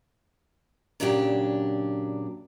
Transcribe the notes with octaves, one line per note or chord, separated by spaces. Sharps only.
A#2 C#3 F#3 D4 G4